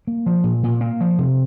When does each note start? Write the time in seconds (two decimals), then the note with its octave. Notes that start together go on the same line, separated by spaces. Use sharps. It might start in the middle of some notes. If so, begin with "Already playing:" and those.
0.07 A#3
0.26 F3
0.44 A#2
0.63 A#2
0.81 A#3
1.01 F3
1.18 C3